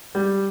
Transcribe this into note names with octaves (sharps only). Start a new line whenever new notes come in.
G3